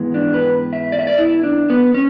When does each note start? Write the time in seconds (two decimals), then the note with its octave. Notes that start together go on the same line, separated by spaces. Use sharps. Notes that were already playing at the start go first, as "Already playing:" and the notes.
Already playing: G#2 E3 G#3 B3
0.14 D4
0.34 B4
0.73 E5
0.92 D5
0.99 E5
1.07 D5
1.18 E4
1.43 D4
1.70 B3
1.94 C#4